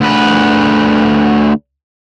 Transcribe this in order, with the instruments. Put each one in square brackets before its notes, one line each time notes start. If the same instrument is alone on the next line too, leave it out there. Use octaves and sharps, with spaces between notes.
[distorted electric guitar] D2 B4